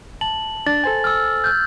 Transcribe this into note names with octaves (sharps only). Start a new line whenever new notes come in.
A5 F#7
D4 A6
A4 C5 G#5
E6 F6
F6 G6